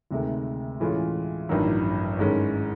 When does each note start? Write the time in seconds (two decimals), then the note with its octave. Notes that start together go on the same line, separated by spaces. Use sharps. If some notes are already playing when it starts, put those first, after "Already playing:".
0.11 D2 C3 D#3 G#3
0.80 A2 E3 G#3 C#4 F4
1.49 A1 G2 D#3 F#3
2.19 G#2 D#3 G#3 C#4